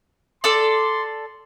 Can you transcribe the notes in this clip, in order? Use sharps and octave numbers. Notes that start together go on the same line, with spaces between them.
A4 D5 C6